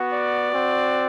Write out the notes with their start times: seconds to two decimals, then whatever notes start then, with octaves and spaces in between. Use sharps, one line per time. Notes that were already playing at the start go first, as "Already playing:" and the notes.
Already playing: B3 F#4
0.13 D5
0.49 C4 F#4